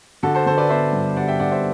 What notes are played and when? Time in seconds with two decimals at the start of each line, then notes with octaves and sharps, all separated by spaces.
0.23 D3 F#4 A4
0.35 A4 C5
0.46 D3 A4 C5
0.58 B4 D5
0.69 B3 C5 E5
0.93 G2
1.16 G3 D5 F#5
1.28 E5 G5
1.39 D3 D5 F#5
1.51 C5 E5